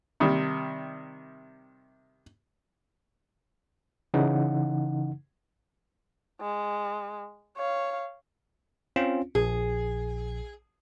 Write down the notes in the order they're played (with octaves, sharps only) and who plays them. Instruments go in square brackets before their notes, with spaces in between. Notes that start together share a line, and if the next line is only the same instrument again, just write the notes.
[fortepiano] C3 D#3 G3
[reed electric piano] C#3 E3 D#4 F#5
[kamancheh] G#3
C#5 F5
[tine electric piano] C4 C#4 F4
[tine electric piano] A#1 [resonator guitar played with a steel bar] G#4